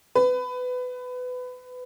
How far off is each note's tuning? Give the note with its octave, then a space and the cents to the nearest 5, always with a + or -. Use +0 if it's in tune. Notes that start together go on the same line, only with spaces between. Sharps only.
B4 +20